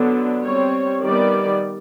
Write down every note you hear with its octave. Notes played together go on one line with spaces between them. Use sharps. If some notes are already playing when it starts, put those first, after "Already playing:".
Already playing: D3 F#3 B3 D4
G3 C4 C#5
D#3 G3 B3 D5